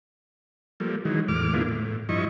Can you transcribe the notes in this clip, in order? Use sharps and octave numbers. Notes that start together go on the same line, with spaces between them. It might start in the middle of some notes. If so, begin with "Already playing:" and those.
F3 G3 A3 A#3
D#3 E3 F#3 G#3
E2 A2 D6 F6
D3 G#3 A#3 B3 E4 F4
A2
G2 F3 E4 D#5 C#6